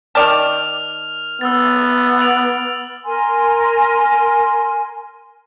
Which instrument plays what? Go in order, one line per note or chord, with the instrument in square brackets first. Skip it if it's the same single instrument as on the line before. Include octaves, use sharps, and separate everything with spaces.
[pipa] D#3 D5 A5 [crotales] F6 F7
[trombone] B3 [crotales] E6 F6 A6
[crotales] D7 F7 F#7
[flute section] A#4 G#5 C6